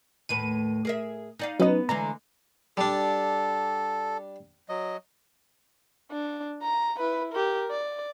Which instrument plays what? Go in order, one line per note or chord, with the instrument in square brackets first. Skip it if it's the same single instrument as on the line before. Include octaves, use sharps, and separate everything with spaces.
[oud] D#2 A2 B4 [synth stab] D#7
[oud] G#4 A#4 E5
D#4 D5 F5
[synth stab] F#3 C#4 D#4 [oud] B3 B4
[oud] D3 E3 G#3 [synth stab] A#5
[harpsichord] G3 D4 [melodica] A4
[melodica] F#3 D#5
[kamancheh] D4
A#5
E4 B4
G4 A#4
D5